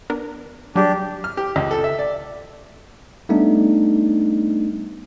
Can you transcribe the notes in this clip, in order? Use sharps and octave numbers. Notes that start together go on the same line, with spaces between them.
B3 D4 A#4
F#3 G3 D4 G4 G#4
F6
G4
C#2
A4
E5
D5
G3 A3 B3 D4 D#4